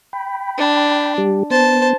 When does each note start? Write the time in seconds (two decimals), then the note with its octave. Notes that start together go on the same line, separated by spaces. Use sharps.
0.13 G5 B5
0.58 D4
1.18 G3 G4
1.51 B3 C5 A5